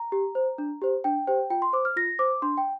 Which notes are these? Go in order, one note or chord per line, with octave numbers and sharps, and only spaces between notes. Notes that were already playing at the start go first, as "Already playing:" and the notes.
Already playing: A#5
G4
C5
D4
G4 C5
D4 G5
G4 C5 G5
F4 G5
C6
C5 D6
F6
F4 A#6
C5 D6
D4 C6
G5